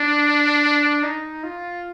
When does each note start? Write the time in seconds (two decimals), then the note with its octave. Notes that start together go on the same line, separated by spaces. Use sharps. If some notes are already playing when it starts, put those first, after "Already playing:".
Already playing: D4
1.04 D#4
1.44 F4